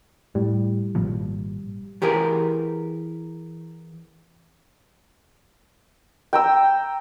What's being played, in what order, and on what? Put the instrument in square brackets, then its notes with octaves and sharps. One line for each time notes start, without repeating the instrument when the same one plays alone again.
[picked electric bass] A2 [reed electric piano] G3
[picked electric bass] G#1 A#2 F3
[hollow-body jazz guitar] E3 G4 G#4 A#4
[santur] G5 A#5 E6